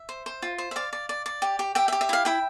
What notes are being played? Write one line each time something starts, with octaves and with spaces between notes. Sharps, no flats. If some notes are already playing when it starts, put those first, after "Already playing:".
Already playing: E5
C5
C5
F4
C5
E5
D5 F5
D5
D5
D5
G4
G4
G4 E5 G5
E5
G4
E5
E4 F5
E4 E5 G5